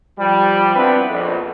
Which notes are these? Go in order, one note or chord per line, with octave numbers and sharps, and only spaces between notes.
F3 G3
B3 C4 D4 E4 B4
A#1 F2